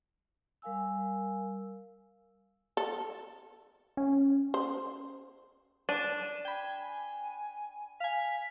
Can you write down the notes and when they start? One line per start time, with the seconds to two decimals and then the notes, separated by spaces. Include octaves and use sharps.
0.62 G3 A#4 F5 G#5 E6
2.77 A4
3.97 C#4
4.54 C5
5.89 D4 D#7 E7
6.45 G5 B5 G#6
6.81 G#5
8.00 F5 G#5 B6